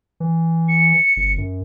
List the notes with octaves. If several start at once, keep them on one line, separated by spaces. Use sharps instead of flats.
E3
C#7
G1
F#2